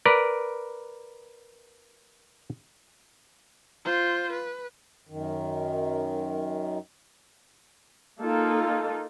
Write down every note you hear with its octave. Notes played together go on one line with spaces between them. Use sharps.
A#4 B4 D5
F4 C5
B4
F#2 D#3
A#3 D#4 F4 A4